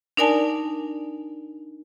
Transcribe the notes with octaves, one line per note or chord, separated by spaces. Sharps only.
D4 D#4 A#4 D5 G#5 A5